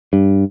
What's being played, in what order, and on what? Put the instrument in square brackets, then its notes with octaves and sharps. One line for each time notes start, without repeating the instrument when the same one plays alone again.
[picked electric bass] G2